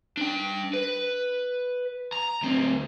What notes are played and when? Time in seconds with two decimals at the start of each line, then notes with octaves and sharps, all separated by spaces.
0.17 D4 G5
0.73 B4
2.13 A#5
2.42 D2 C4